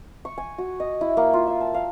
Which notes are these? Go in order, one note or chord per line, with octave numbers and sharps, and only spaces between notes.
C#6
G#5
F#4
D#5
E4
A#3
F4
E5
A5
F5